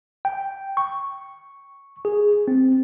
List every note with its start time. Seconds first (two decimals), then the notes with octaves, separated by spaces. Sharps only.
0.25 G5
0.77 C#6
2.05 G#4
2.48 C4